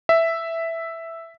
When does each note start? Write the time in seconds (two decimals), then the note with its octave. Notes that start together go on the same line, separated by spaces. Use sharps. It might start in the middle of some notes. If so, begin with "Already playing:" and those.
0.09 E5